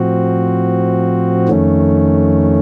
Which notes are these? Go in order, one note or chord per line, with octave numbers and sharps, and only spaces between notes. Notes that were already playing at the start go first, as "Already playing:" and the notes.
Already playing: A2 F3 C4 F#4
F2 D#3 A3 C#4